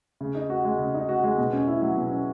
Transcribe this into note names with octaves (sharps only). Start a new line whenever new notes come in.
C#3
D#4
F#4
G#3
C#3
D#4
F#4
G#3
B2
C#4
E4
F#3
B2
C#4